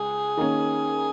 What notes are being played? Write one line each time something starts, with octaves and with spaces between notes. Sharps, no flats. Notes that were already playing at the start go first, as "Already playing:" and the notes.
Already playing: C#2 G#4
D#3 A#3 C#4